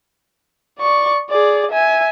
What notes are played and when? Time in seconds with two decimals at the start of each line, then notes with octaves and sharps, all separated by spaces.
0.80 D5 C#6
1.30 G#4 D5
1.71 E5 G#5